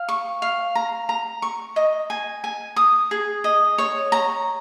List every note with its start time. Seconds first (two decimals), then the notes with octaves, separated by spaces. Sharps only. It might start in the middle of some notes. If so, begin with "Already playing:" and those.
Already playing: F5
0.09 C#6
0.42 F5
0.75 A#5
1.09 A#5
1.42 C#6
1.76 D#5
2.10 G#5
2.44 G#5
2.76 D#6
3.11 G#4
3.44 D#5
3.78 C#5
4.12 A#5